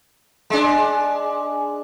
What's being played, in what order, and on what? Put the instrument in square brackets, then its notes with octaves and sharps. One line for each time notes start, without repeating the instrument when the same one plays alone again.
[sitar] G#3 D4